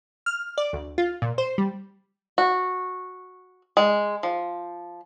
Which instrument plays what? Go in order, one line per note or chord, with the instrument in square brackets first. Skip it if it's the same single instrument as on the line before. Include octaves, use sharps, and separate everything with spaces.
[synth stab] F6
D5
D2
F4
A#2
C5
G3
[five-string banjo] F#4
G#3
F3